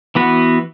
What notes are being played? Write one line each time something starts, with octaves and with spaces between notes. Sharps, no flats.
E3 B3 F#4 B4